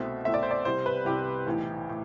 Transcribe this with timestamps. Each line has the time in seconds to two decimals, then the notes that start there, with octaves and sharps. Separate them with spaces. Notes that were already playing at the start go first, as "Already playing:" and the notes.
Already playing: C2 B2 A3 C4 E5
0.25 C2 B2 A3 C4 E5
0.34 D5
0.43 C5
0.51 D5
0.65 C2 C3 G3 C5
0.86 B4
1.05 C2 C3 G3 G4
1.46 B1 A2 E3
1.89 A2